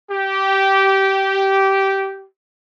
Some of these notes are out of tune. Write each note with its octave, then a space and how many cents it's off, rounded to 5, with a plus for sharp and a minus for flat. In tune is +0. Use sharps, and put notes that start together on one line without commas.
G4 -15